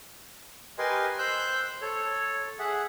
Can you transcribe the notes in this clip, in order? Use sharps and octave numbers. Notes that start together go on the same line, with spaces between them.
G4 A#4 B4 D#5 G#5 C6
C5 E6 F#6 G6
A4 C#5
G#4 E5 F#5